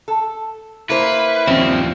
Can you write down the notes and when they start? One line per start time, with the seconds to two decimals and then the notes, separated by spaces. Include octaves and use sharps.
0.08 A4
0.90 A#3 E4 B4 C5
1.47 D#2 F3 G3 C4 C#4